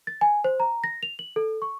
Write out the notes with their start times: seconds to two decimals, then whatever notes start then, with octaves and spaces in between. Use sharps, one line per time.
0.07 A6
0.21 G#5
0.44 C5
0.60 A#5
0.84 A#6
1.03 F7
1.19 F#7
1.36 A4
1.62 C#6